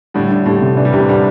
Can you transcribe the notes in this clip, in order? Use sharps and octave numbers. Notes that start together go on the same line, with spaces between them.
A2 D3 G3
D4
A2 D3 G4
C3
E3 D4
G3
C3 E3 G4
D3 G3 D4